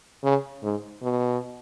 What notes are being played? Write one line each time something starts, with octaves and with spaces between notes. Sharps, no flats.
C#3
G#2
B2